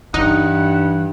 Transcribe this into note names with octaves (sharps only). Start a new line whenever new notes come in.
G2 E3 D#4 F#5